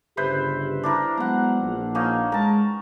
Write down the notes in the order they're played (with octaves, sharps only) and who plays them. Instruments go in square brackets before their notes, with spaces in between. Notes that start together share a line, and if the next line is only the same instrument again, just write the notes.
[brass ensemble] G1 C#3 G4 [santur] B4 C5 E5
[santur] D4 E4 A#4
[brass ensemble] F#3 G#3 B3 [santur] F#5 A#5
[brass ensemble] A#1
[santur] A#3 C#4 D#4
[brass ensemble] G#3 [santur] A#4 A5